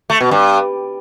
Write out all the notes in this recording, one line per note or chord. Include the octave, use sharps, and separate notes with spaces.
A3
B2
G2